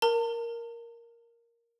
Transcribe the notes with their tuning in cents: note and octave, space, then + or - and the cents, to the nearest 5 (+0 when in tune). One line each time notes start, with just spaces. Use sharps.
A#4 +0 A5 +45